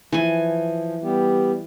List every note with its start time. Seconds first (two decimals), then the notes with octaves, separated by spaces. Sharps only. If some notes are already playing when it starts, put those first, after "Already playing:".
0.12 E3 F3 G#5
1.03 G3 B3 G4